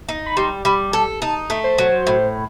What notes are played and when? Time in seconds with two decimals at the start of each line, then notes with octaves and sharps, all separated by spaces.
0.09 D#4
0.26 B5
0.37 G3 C6
0.65 G3 B5
0.93 A4 A5
1.22 D#4 A5
1.50 A3
1.64 C5
1.78 F#3
2.07 A2